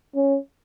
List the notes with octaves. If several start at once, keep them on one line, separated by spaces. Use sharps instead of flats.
C#4